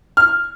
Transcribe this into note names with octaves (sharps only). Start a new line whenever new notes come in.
F6